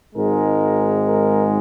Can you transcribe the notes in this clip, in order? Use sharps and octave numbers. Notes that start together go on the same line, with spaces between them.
G#1 G#2 G#3 A#4
A#4